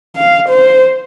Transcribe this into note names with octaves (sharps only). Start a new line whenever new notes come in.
F5
C5